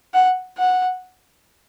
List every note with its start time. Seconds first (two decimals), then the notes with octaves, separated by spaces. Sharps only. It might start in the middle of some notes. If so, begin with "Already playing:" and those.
0.14 F#5
0.58 F#5